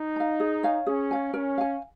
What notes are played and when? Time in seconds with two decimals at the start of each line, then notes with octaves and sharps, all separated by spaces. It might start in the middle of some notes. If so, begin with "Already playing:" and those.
Already playing: D#4
0.16 F5 A#5
0.40 G#4
0.63 C#5 F5 G#5
0.87 C#4 G#4
1.11 C#5 F5 G#5
1.34 C#4 A#4
1.58 F5 G#5